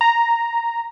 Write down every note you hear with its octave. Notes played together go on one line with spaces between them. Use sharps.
A#5